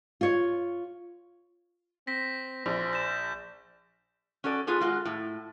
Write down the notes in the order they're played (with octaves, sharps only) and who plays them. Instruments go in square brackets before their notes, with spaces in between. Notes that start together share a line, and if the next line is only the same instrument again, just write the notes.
[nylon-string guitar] F4 C#5
[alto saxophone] C4 [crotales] A#6 B6
[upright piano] A#1 [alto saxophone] C5
[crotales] G6 E7
[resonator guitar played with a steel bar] C#4 F#4 A4 D5
B3 F4 G#4 A4
G#3 F4 F#4
A2